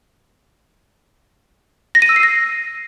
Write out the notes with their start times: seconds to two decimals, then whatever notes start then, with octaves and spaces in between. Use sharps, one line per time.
1.95 A#6
2.02 D#7
2.09 E6
2.16 C7
2.23 A#6